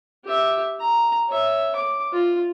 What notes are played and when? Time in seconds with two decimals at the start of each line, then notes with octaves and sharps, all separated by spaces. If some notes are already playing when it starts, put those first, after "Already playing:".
0.24 G4 E5
0.80 A#5
1.28 C#5 E5
1.76 D6
2.13 F4